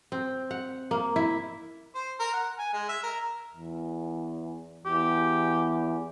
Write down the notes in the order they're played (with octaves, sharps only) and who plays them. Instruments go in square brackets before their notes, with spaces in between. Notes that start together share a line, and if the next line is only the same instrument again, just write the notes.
[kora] C4
F#5
A#3
E4
[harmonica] C5
A#4
F#5
G#5
G#3
E5
A#4
[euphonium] E2
[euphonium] E2 [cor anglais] G4